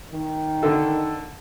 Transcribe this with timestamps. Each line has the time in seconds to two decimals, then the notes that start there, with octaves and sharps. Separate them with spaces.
0.12 D#3
0.63 D3 A4